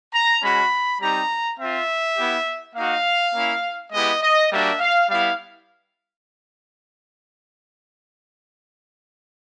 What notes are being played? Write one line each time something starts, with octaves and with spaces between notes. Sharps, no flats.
A#5
G#3 C#4 F#4 B5
G3 C4 D#4 G4 A#5
C4 F4 E5
B3 E4 G4
A#3 D#4 F#4 F5
A#3 C#4 E4
G#3 B3 E4 G4 D#5
D#5
G3 A#3 D4 F#4 E5
F5
G3 B3 E4 F5